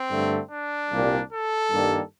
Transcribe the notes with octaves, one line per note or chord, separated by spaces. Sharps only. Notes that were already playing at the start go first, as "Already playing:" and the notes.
Already playing: C4
G2 D3 A3
D4
C2 A#2 G3 A#3
A4
G2 D#3 G3 A#3